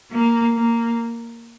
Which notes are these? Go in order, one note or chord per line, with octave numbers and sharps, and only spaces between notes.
A#3
A#3